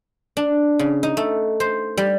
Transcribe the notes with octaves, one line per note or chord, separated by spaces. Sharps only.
D4
C#3
D#4
A3
C5
G3